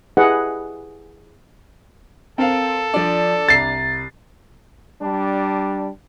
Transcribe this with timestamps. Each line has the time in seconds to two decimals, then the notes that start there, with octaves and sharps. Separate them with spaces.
0.17 E4 G4 G#4 B4 D#5 F#5
2.38 C4 A4 A#4 F5
2.94 F3 D4 D5
3.48 C2 A#5 A6 C7
5.02 G3 D4